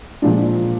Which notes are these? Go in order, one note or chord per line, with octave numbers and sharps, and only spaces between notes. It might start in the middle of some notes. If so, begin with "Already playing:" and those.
A#2 F3 G#3 D4